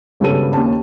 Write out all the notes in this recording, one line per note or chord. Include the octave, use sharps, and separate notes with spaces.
G#1 G2 C#3 B3 A4 D#7
D#2 C#4 A5